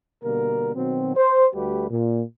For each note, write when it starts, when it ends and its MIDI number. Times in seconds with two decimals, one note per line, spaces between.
0.24 0.74 47
0.24 0.74 50
0.24 0.74 55
0.24 0.74 58
0.24 0.74 70
0.75 1.12 47
0.75 1.12 51
0.75 1.12 54
0.75 1.12 60
1.16 1.48 72
1.55 1.87 38
1.55 1.87 55
1.55 1.87 57
1.55 1.87 66
1.55 1.87 67
1.55 1.87 71
1.90 2.23 46